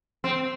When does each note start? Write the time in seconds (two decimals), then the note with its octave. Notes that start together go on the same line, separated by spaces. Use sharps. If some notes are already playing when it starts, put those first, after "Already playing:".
0.24 C4